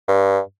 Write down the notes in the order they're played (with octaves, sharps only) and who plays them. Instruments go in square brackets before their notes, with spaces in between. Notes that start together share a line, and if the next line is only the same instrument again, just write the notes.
[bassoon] G2